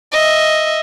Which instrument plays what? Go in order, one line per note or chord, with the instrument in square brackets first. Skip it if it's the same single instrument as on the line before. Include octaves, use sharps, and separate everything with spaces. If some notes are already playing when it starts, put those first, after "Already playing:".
[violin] D#5 E5